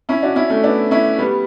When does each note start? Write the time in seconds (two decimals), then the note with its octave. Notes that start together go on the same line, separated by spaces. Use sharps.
0.09 C#4 E4
0.23 D4 F#4
0.36 C#4 E4
0.50 A3 C#4
0.64 B3 D4
0.91 C#4 E4
1.19 G3 B3